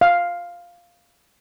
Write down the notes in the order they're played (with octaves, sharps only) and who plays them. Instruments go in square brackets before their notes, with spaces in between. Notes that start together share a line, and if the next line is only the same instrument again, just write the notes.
[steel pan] F5